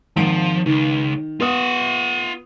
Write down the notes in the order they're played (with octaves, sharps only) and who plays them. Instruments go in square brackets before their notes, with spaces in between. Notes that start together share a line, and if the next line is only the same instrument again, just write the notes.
[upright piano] G#1 D7 [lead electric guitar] F3
[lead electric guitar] C#2 [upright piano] D#3
[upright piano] B3 D#6 [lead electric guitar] F4 F#5